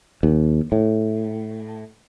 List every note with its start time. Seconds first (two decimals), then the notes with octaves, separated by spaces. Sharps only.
0.23 D#2
0.72 A2